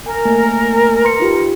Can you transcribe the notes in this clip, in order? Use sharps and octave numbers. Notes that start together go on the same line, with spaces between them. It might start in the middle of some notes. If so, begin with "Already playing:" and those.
A#4 G#5
A3 A#3 G#5
B4 C6 C#7
D#4 F4 G4